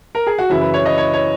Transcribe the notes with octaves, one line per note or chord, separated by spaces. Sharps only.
A#4
G#4
F#4
F#2 C#3 E3 E4
B4
C#5
D#5
C#5
C#5